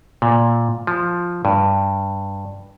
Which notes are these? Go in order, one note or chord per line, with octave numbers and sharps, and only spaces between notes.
A#2
F3
G2